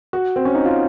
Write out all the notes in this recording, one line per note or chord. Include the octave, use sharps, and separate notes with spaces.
F#4
C4
C#4
D#4
F4